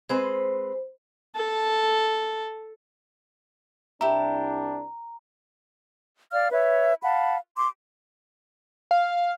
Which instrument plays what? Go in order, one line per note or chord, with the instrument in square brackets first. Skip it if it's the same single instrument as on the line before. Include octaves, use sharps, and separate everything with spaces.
[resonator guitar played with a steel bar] G#3 C4 B4 [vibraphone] C5
[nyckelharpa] A4 A5
[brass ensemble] C2 D4 [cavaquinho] E4 G4 [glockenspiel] A#5
[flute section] D5 F5 F6
B4 C#5 E5
F5 F#5 A5 B5
C6 D6
[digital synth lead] F5